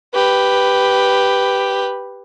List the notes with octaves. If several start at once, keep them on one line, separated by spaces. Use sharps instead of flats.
G4 B4